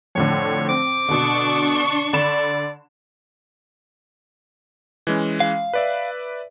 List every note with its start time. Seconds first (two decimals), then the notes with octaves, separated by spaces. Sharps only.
0.15 F2 A2 D3 C#5
0.69 C4 D6
1.09 B2 D3 D4 C#6
2.13 D3 D5 B5 E7
5.07 E3 G#3 C#4
5.40 F5
5.74 B4 D5 E5